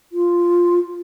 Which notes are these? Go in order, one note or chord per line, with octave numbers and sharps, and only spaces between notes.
F4